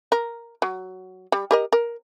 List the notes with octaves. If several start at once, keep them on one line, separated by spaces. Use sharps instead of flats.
A#4
F#3
G3
G4 A#4 D#5
A#4